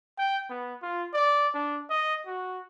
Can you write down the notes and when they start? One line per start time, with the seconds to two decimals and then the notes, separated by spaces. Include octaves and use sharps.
0.19 G5
0.50 B3
0.83 F4
1.14 D5
1.55 D4
1.90 D#5
2.26 F#4